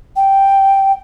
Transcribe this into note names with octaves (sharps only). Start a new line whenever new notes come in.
G5